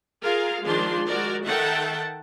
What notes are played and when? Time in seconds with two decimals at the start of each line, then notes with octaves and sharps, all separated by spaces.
0.23 F4 G#4 A#4 F5
0.65 D#3 F3 G#3 D4 C6
1.08 G#3 F#4 A#4 D5
1.46 D#3 A4 E5 F#5 G5 A5